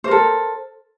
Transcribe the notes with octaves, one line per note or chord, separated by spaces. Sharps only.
A4 A#4 C5